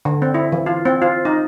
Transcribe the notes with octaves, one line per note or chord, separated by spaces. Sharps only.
D3
C4
E4
E3
F4
C4
F4
D#4